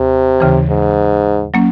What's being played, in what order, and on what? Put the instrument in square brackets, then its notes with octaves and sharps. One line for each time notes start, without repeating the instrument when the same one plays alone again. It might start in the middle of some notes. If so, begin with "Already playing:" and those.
Already playing: [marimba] D#2 [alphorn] C3
[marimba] D#2 C#3 E3
[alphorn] G#2
[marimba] F#3 A#3 C#4